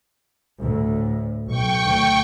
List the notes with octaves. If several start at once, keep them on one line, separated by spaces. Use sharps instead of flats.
D2 A2
B1 G5 C#6
D2